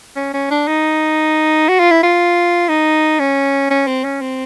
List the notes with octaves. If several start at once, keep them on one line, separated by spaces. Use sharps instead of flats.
C#4
C#4
D4
D#4
F#4
F4
E4
F4
D#4
C#4
C#4
C4
C#4
C4